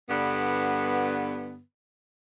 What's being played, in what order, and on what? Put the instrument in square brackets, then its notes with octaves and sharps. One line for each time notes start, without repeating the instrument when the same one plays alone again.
[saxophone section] G2 D3 B3